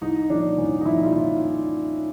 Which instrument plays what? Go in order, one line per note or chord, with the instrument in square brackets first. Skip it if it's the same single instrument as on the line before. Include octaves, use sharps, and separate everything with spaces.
[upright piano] C2 D#4
A#2 F3 D4
C2 C#4
D#4
A#2 F3 E4
F4
C2 E4